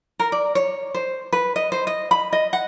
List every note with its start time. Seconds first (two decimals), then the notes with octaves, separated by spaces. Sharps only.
0.19 A#4
0.32 D5
0.55 C#5
0.94 C5
1.33 B4
1.56 D#5
1.72 C5
1.87 D#5
2.11 B5
2.33 D#5
2.53 F#5